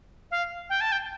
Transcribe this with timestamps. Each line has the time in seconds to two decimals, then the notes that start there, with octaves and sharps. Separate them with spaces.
0.31 F5
0.69 G5
0.81 A5
0.92 G5